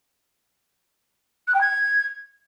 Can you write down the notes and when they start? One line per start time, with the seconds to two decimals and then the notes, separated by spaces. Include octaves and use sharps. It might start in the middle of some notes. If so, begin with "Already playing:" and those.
1.48 F#6
1.54 G5
1.61 G#6